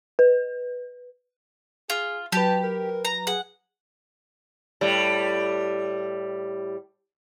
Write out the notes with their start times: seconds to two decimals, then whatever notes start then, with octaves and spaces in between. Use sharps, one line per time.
0.19 B4
1.90 F4 G#4
2.32 F#3 G4 B4 A5
2.63 A#4
3.05 A#5
3.27 G#4 F#5
4.81 A2 G3